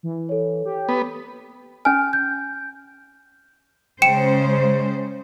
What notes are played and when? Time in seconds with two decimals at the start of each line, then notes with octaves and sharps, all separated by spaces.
0.03 E3
0.29 A4 C#5
0.65 G4
0.89 B3
1.85 C#4 G#5 F6
2.13 G6
4.02 C#3 G#3 C5 G5 C#7 E7